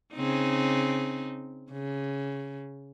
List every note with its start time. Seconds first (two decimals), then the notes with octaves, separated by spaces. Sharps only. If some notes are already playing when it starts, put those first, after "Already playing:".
0.15 C#3 C4 D#4
1.72 C#3